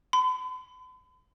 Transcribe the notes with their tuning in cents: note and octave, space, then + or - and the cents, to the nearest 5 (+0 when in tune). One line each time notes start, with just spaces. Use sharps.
B5 +45